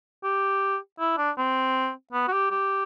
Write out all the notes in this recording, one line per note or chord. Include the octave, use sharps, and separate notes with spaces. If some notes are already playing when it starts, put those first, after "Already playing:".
G4
E4
D4
C4
B3
F#4
G4
G4